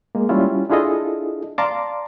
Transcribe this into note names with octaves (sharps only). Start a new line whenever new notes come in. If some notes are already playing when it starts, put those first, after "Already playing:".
G#3 A#3
G3 C#4 E4 F4
D4 E4 F4 G#4 A4 D#5
D5 F5 A5 A#5 C6 D6